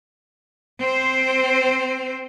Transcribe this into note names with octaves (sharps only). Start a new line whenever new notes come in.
C4 C5